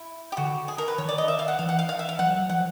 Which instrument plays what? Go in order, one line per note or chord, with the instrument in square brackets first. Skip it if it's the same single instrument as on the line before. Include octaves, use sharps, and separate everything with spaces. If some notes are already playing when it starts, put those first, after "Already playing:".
Already playing: [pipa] E4
G4
[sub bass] D3 [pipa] F#4
[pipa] G#4
A#4
B4
[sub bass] D#3 [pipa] C#5
[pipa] D5
D#5
E5
F5
F#5
[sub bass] E3 [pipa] F5
[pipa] F#5
F5
F5
E5
F5
[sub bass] F3 [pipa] F#5
[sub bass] F#3
F#3
[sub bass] F3 [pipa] F#5